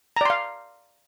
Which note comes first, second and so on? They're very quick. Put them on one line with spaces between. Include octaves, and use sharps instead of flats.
A#5 D5 C6 F5